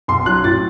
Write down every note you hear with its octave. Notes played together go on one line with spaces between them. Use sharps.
B1 C6
F#3 F#6
A2 A6